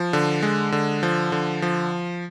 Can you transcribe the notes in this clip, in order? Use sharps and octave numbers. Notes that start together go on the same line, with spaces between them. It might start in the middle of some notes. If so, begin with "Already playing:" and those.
Already playing: F3
D3
G#3
D3
F3
D3
F3